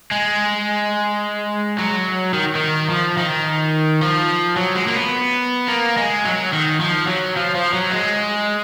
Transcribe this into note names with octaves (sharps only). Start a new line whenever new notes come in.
G#3
F#3
D#3
D#3
F3
D#3
F3
F#3
G#3
A#3
B3
A#3
G#3
F#3
D#3
F3
F#3
F3
F3
F#3
G#3